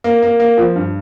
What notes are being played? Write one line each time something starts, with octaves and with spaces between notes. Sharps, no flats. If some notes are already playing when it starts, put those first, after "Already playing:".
A#3
A#3
A#3
F3
G2